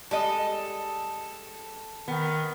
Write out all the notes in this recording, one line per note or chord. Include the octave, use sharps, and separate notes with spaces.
G3 G#3 A4 D#5
D#3 B3